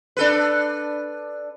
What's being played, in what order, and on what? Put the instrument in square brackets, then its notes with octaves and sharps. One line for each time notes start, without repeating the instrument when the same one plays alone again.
[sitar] D4 A4 B4